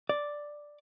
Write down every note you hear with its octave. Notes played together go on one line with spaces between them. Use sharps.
D5